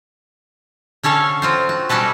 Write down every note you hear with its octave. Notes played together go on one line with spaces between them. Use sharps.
D3 C#4 A4 C#5 F5
C4 F4 C5
F#4
B2 G3 C#4 F#4 A4 B4